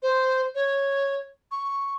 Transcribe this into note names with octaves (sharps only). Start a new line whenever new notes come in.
C5
C#5
C#6